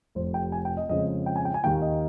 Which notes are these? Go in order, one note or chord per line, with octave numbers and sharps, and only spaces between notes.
F1 F2 C3 C5
G5
G#5
G5
D#5
F2 C#3 G#3 D#5
G5
G#5
G5
G#5
D#2 D#3 A#3 G5
D#5